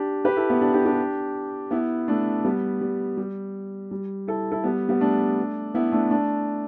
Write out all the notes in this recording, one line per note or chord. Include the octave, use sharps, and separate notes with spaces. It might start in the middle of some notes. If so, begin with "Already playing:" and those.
Already playing: D4 G4
G4 B4
E4 A4
B3 E4
D4 G4
D4 G4
D4 G4
B3 E4
A3 D4
G3 B3
G3
G3
G3
E4 A4
E4 A4
G3 B3
G3 B3
A3 D4
B3 E4
A3 D4
A3 D4